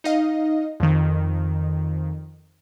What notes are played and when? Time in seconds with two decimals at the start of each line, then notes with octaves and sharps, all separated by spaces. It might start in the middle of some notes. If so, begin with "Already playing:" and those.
0.04 D#4 D#5 F5
0.80 F2 D#3